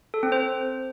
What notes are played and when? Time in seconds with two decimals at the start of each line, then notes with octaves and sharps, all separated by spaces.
0.14 A4
0.23 C4
0.32 C5